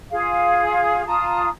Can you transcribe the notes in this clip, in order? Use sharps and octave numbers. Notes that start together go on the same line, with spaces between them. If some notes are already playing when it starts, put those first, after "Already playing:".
F4 G#4 F5
F4 A5 A#5 D#6